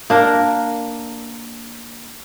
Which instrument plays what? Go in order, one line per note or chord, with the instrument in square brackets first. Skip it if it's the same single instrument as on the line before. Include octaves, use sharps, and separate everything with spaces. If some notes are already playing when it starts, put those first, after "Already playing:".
[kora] A#3 D4 A#4